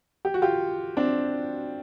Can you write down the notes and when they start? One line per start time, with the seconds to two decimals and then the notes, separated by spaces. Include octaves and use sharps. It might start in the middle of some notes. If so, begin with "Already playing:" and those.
0.25 G4
0.34 F#4
0.42 F4 G4
0.97 C4 D4